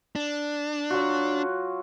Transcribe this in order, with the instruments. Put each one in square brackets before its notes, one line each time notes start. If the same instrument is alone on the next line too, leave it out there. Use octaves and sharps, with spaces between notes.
[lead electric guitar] D4
[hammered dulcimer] F#3 F4 F#4